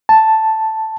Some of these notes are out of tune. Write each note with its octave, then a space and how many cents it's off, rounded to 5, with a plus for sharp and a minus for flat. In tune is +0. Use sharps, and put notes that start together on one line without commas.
A5 +0